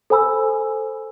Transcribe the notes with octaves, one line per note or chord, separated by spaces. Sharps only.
A4 C5 G#5 B5 E6